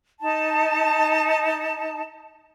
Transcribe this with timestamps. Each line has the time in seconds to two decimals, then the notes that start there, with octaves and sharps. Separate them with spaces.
0.20 D#4 A5